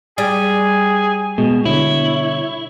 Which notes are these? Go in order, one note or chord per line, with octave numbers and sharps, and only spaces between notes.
G3 G#4
B2 G#3
B2 D3 E4 C#5